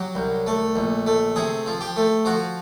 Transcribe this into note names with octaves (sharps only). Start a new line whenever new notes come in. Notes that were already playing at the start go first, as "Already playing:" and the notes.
Already playing: F#3 G4
C2
A3
A#1
A3
C3 G#4
F3
G4
A3
F3 F#4